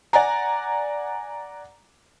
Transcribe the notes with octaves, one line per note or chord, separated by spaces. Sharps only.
D5 F#5 G#5 A#5